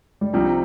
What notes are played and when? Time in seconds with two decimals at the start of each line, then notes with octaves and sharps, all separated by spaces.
0.21 G3
0.33 C2 C3 F3 G3 D#4